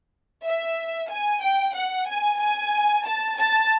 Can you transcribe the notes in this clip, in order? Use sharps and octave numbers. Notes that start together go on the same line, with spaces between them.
E5
G#5
G5
F#5
G#5
G#5
A5
A5